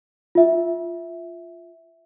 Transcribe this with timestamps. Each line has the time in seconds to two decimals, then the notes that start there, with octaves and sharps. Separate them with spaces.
0.35 F4 E5